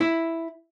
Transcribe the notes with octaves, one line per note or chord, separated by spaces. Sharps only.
E4